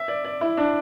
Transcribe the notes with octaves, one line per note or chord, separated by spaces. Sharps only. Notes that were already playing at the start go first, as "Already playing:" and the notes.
Already playing: E5
D5
D5
E4
D4